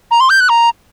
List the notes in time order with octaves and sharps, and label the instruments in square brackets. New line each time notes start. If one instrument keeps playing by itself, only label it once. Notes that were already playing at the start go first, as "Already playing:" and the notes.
[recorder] A#5
C6
G6
F#6
A#5